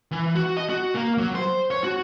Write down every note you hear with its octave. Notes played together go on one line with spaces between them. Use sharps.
E3
F#4
D#5
F#4
A#3
F#3
C5
C#5
F#4